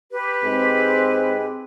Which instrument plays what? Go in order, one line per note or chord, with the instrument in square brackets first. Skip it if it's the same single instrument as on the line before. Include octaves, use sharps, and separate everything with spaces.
[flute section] G4 B4
[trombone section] G#2 G#3 C4